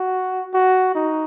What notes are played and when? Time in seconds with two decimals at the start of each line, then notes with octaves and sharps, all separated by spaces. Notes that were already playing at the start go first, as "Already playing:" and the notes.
Already playing: F#4
0.54 F#4
0.95 D#4